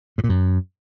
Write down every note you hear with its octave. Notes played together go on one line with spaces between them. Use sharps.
G#2
A#2
F#2